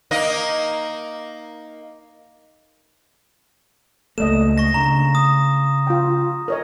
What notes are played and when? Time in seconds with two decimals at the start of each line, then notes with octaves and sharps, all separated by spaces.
0.11 A#3 D#4 D#5
4.18 C#2 A3 A#3 A4 D5 D#5 E7
4.58 C#6 A#6
4.74 C#3 D4 A#5
5.15 D#6
5.87 F4 G5
6.48 A#4 C#5 D#5